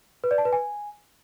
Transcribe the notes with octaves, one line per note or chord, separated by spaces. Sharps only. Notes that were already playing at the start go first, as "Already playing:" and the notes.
B4
D5
A5
B4
G#5